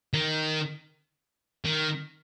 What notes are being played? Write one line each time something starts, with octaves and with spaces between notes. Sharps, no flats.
D#3
D#3